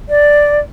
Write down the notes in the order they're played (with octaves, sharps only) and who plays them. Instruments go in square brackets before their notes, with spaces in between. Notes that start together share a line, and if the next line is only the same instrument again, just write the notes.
[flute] D5